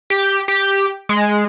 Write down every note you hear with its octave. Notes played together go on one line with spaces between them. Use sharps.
G4
G4
G#3